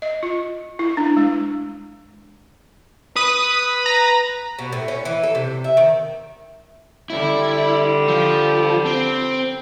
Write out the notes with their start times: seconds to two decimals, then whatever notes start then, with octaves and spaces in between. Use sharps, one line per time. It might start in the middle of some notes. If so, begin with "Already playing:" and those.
0.02 D#5
0.23 F4
0.79 E4
0.97 D4
1.17 G#3
3.16 B4 D#6
3.86 A#5
4.59 B2
4.72 A2
4.88 C#4
5.05 E3
5.23 A4
5.35 C3
5.64 E5
5.77 D#3
7.10 D3 G3 E4
8.08 F3
8.86 C4